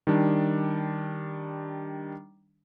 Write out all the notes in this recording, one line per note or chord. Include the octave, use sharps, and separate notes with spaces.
D#3 G3 D4